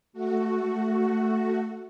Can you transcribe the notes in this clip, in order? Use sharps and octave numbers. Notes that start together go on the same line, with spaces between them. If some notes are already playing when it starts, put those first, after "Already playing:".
A3 F#4